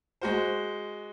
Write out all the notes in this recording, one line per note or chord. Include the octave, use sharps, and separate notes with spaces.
G#3 F#4 C5